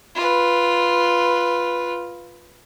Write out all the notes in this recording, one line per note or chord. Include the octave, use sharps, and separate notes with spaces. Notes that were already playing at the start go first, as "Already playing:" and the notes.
F4 B4